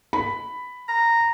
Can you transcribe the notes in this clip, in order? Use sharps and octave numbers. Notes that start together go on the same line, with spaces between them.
B5
A#5